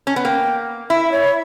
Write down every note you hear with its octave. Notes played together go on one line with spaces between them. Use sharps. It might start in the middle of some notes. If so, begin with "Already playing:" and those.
C#4
B3
A#3 G5
E4 E5
C#5